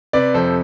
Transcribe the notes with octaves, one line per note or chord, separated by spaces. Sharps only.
C3 B4 D5
F2 A4 C5